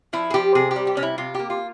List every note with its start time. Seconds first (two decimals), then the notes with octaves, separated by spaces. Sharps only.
0.13 F3 E4
0.30 G#4
0.34 F3 G4
0.55 C3 G#4
0.71 G4
0.76 G3
0.87 G4
0.97 C3 C#4
1.03 E4
1.18 C3 F4
1.34 A#3 G4
1.50 F4